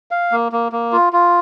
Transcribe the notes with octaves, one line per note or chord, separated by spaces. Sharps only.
F5
A#3
A#3
A#3
F4
F4